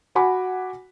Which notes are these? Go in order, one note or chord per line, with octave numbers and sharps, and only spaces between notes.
F#4 F#5 G#5 B5 D6